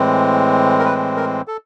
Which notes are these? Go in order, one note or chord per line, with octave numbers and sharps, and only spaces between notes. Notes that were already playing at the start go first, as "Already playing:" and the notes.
Already playing: A2 E3 G#3 C4
A#4
B4
A#4
A4